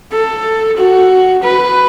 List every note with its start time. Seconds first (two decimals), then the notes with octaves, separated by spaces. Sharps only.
0.12 A4
0.77 F#4
1.43 B4